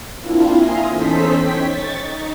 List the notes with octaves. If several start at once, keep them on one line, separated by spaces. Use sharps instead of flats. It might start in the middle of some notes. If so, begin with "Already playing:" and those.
A#3 C4 D4 E4 F4
E5 F5 G#5 A#5 C6 D#6
E2 C#4 D#4 A4 C5 B6
C#5 G5 B6
C#6 A6
D#4